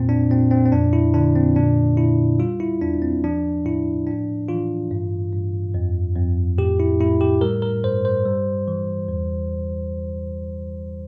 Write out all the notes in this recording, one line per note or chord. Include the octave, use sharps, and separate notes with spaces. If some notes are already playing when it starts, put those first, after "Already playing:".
Already playing: F2 A#2 C4
D4
A#2 C4
C4
C4
F2 D4
E4
D3 D4
C4
A#2 D4
A#2 E4
G3 F4
E4
E2 D4
C4
F3 D4
A2 E4
A2 D4
E3 F4
G2
G2
F2
F2
A2 G4
E4
A2 E4
G4
G3 A#4
A#4
G2 C5
C5
G3
E3
E2